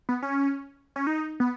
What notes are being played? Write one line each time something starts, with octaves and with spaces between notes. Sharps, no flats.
B3
C#4
C#4
D#4
B3